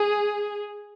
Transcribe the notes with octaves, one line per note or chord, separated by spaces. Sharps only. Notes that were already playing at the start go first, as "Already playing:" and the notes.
Already playing: G#4